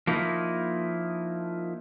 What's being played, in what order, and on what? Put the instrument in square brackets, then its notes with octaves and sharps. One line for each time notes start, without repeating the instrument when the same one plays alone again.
[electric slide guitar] F3 A#3 D#4 E4